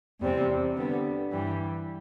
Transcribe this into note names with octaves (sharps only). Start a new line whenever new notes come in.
E2 C3 G3 C4
D3 G3 B3
G2 E3 G3